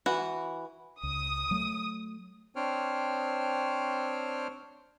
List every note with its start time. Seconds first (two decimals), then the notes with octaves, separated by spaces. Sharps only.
0.06 E3 F#4
1.03 C#2 D#6
1.51 F#3 A3
2.56 C4 D4 C5 C#5 G5 F6